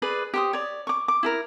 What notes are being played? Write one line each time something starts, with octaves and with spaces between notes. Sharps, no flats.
G#4 B4 D5
G4 C5 D#6
C#5 D5
C#6 D6
D6
E4 G#4 A#4